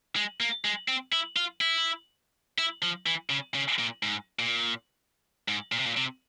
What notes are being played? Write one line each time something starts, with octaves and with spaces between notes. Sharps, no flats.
G#3
A#3
G#3
C4
E4
F4
E4
E4
F3
E3
C#3
C#3
A#2
G#2
A#2
G#2
A#2
C3
A#2
C3